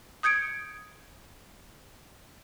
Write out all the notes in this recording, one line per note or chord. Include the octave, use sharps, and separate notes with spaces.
D#6 G6 G#6 C#7 D7